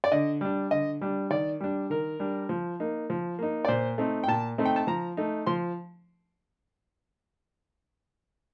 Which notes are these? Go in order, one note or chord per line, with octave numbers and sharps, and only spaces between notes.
D5
D3 D#5
G3 D4
D3 D#5
G3 D4
D#3 D5
G3 D4
D#3 A#4
G3 D4
F3
A#3 D#4
F3
A#3 D#4
D5
A#2 C5
A3 C4 D#4
G5
A#2 A5
A3 C4 D#4
G5
A5
F3 A#5
A3 D#4
F3 C6